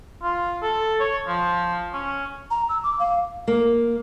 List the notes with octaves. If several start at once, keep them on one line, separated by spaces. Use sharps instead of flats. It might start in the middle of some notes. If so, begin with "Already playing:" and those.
F4
A4
C#5
F3
C#4
A#5
E6
D6
F5
A#3